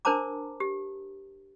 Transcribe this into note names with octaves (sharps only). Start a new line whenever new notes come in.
D4 A#4 C5 A5 A#5 D6
G4